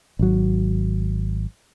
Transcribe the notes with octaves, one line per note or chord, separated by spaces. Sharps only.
G#1 F#3